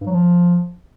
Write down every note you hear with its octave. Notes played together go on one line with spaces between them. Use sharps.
G2
F#3
F3